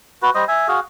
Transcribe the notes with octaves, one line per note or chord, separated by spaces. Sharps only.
F#4 B4
G3 C5 D#5
E5 G#5
F#4 G#4 F5